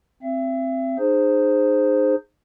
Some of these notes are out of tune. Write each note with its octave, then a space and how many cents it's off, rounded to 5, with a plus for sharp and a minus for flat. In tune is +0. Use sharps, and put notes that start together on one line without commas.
C4 +0 E5 +40
D#4 -40 G#4 +0 C5 +0